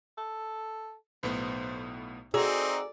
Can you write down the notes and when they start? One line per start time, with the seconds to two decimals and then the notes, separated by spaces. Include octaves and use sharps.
0.18 A4
1.23 B1 A2 B3 C5
2.34 C4 D#4 F#4 G#4 D5 A#5 E6